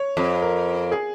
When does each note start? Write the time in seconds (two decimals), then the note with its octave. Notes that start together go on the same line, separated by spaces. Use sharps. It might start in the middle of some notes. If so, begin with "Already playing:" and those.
Already playing: C#5
0.17 F2
0.42 A#4
0.92 G#4